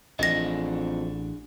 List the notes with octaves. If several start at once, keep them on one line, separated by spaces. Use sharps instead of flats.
A1 F2 D4 F#4 G#4 D#5 A#6